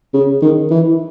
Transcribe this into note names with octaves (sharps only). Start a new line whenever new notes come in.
C#3
D#3
E3